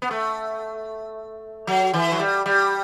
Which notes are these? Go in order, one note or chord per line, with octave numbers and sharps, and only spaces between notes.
B3
A3
F#3
E3
F#3
G3
G3